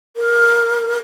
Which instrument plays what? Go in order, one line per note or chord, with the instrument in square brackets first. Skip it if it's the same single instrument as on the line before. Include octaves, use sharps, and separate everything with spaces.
[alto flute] A#4